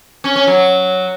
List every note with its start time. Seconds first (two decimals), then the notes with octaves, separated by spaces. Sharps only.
0.24 C#4
0.36 C#4
0.47 F#3